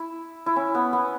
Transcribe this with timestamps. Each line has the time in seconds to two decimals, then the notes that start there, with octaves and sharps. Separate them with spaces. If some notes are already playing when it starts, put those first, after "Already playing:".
Already playing: E4
0.46 E4
0.56 C#4
0.74 B3
0.93 B3